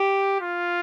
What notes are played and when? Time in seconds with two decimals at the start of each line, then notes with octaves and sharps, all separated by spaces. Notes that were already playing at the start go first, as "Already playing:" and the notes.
Already playing: G4
0.41 F4